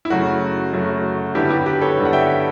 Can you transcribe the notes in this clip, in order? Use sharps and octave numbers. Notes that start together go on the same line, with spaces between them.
E4
F#2 C#3 F#3 A3 F#4
F#2 C#3 F#3 A3
G2 D3 G3 B3 E4 G4
E4 G4
G4 B4
A4 C#5
G2 D3 G3 B3
F#5
E5 G5